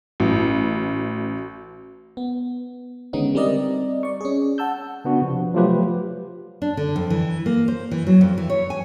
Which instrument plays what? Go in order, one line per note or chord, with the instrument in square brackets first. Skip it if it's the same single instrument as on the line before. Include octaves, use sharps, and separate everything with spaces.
[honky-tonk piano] A1 [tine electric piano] F#4
[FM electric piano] B3
D3 D#3 G#3 B3 C#4 D#4
G3 C4 A#4 D5 D#5
D5 C#6
C#4 G#4
F#5 A5 E6 G6
[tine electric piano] C#3 B3 D4 F#4
C3 F3
F3 F#3 A3 F4 G4 B4
[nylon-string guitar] D4
D3
F2
E3
A#3
C5
E3
F#3
F2
E3
C#5
G#5